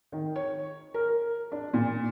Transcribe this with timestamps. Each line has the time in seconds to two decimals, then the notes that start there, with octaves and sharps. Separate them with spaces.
0.12 D#3
0.36 C#5
0.94 A#4
1.52 D4
1.74 A#2